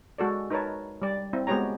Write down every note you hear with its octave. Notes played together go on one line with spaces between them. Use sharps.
G#3 F#4 A4 D5
D#4 A#4 B4 C#5 A5
G3 D5
C4 E4
G#3 B3 F#4 G4 C#5 A#5